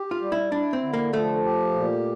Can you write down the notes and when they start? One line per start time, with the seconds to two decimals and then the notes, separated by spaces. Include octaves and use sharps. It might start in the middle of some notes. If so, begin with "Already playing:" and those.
Already playing: G4
0.11 F4
0.21 G3
0.32 E4
0.52 D4 E4
0.73 C4
0.83 D3
0.94 A#3
1.13 F3 A3
1.45 G4
1.75 A#2